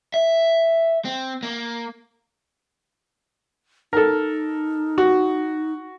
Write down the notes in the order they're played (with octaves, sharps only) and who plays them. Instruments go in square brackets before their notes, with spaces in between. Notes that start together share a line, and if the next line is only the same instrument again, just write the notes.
[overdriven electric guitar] E5
C4
A#3
[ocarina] D#4 [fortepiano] A4 A#4
[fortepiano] F#4